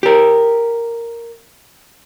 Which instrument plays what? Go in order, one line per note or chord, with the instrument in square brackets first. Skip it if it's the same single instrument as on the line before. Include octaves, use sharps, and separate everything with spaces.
[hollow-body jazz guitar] G4 A#4